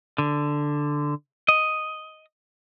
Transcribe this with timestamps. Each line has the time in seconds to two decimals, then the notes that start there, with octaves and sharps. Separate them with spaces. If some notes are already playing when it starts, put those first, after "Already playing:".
0.18 D3
1.48 D#5